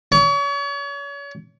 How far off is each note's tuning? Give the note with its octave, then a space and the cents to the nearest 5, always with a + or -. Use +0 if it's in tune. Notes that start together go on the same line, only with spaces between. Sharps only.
C#5 +35